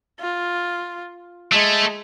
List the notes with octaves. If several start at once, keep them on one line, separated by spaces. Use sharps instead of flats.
F4
G#3 A3